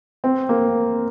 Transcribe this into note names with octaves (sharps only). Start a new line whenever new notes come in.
C4
A#3